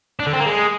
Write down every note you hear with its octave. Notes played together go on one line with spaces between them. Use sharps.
D4
D3
C4
A#3
G#3